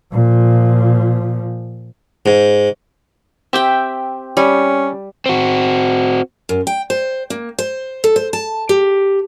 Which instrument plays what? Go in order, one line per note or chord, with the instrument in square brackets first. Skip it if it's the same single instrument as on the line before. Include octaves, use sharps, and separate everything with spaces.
[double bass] A#2 F3
[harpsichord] G#2
[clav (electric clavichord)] C4 G4 [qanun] E5 G5
[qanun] G3 [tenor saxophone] C#4
[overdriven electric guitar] C4 F#4
[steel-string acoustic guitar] F#2
G5
C5
A#3
C5
A4
C5
A5
G4